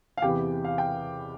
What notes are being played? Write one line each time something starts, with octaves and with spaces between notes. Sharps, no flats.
F5
E2 C3 E3 B3 G4 G5
F5
G5